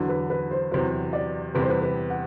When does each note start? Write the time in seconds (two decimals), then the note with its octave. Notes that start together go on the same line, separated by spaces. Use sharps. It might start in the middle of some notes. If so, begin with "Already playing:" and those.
Already playing: E2 D3 F#3
0.09 B4
0.30 B4
0.51 C5
0.71 E2 C3 F#3 C5
1.13 D5
1.55 E2 C3 G3 B3 B4
1.62 C5
1.69 B4
1.82 B4
2.10 F#5